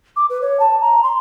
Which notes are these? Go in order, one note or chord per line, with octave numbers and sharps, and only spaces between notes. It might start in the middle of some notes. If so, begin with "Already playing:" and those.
D6
B4
C#5
A5
A#5
C6